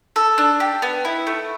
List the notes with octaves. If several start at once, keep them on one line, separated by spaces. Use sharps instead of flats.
A4
D4
G4
B3
E4
A3